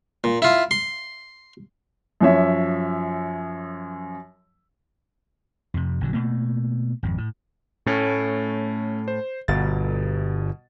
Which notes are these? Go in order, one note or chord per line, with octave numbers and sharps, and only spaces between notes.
A#2
E4 F4
C6
F#2 F3 C#5 E5
F2 C3
A#1 D3 F#3
B2 A3 A#3
G#1 F2
A2
A2 A3 C#4
C5
G1 B2 A6